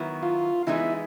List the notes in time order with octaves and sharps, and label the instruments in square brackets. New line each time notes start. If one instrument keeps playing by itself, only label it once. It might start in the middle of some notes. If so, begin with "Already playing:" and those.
Already playing: [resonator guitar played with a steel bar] D#3 F#3 B3 E4
[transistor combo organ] F4
[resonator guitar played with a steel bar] E3 G#3 B3 D#4 G#4 [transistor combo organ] E4